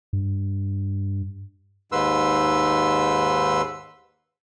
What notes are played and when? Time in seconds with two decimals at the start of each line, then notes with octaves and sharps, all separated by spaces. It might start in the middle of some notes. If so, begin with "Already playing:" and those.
0.13 G2
1.92 D#2 G#2 B4 C6 E6